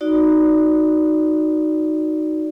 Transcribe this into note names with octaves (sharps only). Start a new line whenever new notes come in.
D#4 F#4 D5